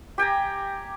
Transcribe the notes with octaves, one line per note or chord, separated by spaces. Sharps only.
G4 G5 G#5 A#5